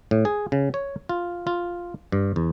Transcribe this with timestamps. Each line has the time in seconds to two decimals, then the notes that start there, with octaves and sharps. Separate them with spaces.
0.11 A2
0.25 G#4
0.52 C#3
0.74 C#5
1.09 F4
1.47 F4
2.12 G2
2.36 E2